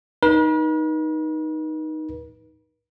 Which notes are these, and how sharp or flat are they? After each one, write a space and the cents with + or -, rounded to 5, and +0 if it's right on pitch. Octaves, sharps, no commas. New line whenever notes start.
D#4 +0 B4 -45